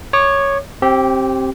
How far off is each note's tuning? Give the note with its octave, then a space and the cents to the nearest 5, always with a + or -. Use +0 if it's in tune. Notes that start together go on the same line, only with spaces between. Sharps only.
C#5 +0 D6 +35
C4 +20 G4 -15